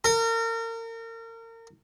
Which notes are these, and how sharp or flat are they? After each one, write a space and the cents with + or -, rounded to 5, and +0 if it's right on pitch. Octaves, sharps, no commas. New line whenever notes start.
A#4 -35